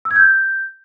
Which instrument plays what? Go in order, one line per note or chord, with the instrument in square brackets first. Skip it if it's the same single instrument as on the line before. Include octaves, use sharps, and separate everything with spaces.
[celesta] E6
G#6
G6